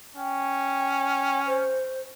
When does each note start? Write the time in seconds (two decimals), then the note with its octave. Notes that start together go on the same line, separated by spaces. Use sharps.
0.16 C#4 G5
1.47 C5